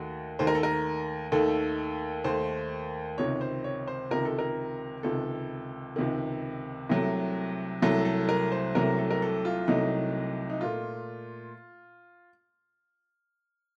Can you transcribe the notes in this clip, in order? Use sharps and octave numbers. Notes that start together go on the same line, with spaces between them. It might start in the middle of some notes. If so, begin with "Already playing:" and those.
Already playing: D#2 D#3 A3 F#4
D#2 D#3 A3 C5
A#4
A4
A#4
D#2 D#3 A3 A4
D#2 D#3 A3 C5
C#2 C3 D#3 C#5
C5
C#5
C5
C#2 C3 D#3 A#4
A4
A#4
C#2 C3 D#3 A4
C#2 C3 D#3
C2 C3 F#3 A3
C2 C3 F#3 A3 A4
A4
A#4
C5
C2 C3 F#3 A3 A#4
A4
A#4
A4
F4
C2 C3 F#3 A3 D#4
D#4
A#2 A3 F4